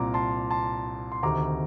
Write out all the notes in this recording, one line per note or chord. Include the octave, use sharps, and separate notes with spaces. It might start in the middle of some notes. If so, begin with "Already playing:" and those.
Already playing: C2 A#2 A#5 D6
A5 C6
A5 C6
C6
D2 C3 D#3 A#5 D6